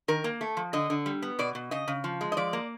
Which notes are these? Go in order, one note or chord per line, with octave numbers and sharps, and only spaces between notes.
D#3 A#4
A#3
A3
F3
D3 D#5
D3
G3
B3
B2 D5
B2
C#3 D#5
C#3
F3
G#3
D#5
F3 D5
A#3